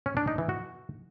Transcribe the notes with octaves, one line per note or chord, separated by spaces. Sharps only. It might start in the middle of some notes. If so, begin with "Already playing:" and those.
C#4
D4
D#4
E3
F#4